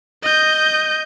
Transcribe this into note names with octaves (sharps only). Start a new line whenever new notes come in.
D#5 G6